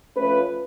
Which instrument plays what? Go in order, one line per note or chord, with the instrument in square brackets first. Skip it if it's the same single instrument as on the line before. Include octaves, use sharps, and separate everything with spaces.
[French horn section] F3 A3 C#4 B4